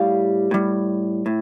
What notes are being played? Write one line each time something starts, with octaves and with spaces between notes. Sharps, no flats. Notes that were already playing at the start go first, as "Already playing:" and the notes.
Already playing: A2 G3 F5
A2 G3
A2